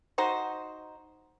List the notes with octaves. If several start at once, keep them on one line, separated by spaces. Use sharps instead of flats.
D#4 F#4 C5